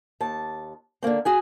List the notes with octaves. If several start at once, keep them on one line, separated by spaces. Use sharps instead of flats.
D#2 A5
D3 D#3 A#3 C4
F#4 G#4 G#5